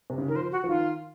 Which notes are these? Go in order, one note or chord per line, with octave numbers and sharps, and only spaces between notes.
C3
C#3
D#3 A#4
F3 C5
F#4
F3
D#3 F4